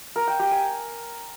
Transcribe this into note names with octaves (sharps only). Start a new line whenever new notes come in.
A#4
G5
G4
G#5